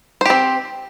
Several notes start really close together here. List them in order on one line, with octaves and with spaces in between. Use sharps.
C5 G4 C4